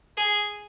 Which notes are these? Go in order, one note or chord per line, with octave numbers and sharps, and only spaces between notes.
G#4